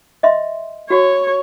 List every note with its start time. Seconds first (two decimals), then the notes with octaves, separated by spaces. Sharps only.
0.23 D#5 E5 C6
0.90 F#4 C#5